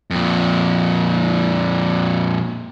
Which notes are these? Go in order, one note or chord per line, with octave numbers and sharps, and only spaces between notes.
F2 A#2